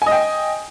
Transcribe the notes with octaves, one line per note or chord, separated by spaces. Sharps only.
D#5 G5 G#5